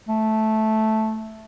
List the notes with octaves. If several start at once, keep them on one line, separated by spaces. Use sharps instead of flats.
A3